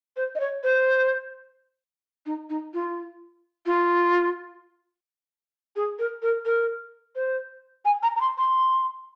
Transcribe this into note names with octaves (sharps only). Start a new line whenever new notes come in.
C5
D#5
C#5
C5
D#4
D#4
F4
F4
G#4
A#4
A#4
A#4
C5
G#5
A#5
A#5
C6
C6